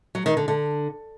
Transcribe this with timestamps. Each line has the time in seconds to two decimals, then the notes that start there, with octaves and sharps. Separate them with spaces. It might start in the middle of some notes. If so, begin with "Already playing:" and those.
0.15 F#3
0.26 D#3
0.37 D3
0.48 D3